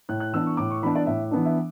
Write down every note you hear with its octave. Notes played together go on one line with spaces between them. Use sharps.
A2 F#6
F#6
E3 B3 D4 E6
C#6
A2 D6
C#6
E3 B3 D4 B5
D5
A2 E5
E3 B3 D4
E5